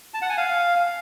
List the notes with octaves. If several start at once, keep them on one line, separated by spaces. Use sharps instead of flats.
A5
F#5
G#5
F5